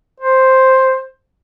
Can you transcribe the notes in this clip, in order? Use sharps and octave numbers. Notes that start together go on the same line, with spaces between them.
C5